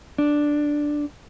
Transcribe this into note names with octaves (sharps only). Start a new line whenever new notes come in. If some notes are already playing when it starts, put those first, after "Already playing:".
D4